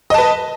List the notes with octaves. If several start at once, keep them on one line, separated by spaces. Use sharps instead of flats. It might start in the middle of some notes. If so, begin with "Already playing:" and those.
B4 D#5 A5